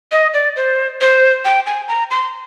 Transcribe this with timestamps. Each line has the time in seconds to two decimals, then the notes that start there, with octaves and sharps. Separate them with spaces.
0.12 D#5
0.34 D5
0.56 C5
1.01 C5
1.45 G5
1.66 G#5
1.88 A#5
2.11 C6